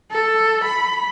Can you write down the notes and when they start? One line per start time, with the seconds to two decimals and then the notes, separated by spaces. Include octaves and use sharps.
0.11 A4
0.64 B5